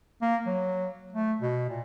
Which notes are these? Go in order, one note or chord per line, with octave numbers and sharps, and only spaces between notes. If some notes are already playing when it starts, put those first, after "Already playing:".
A#3
F#3
A3
B2
A#2